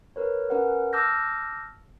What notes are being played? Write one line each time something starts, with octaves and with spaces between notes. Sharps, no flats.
A#4 B4 C#5
C#4 A#4 B4 F#5
A5 D6 E6 F6 G6 A#6